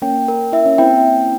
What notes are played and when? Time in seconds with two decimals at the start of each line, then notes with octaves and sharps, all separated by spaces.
0.02 A#3 C#4 G5
0.28 A#4
0.53 E4 E5
0.65 C#4
0.78 C4 E4 G5